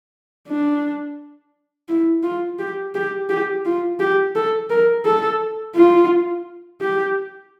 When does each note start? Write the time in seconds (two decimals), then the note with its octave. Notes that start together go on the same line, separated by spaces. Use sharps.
0.48 D4
1.89 E4
2.23 F4
2.59 G4
2.95 G4
3.30 G4
3.65 F4
4.00 G4
4.35 A4
4.70 A#4
5.06 A4
5.76 F4
6.81 G4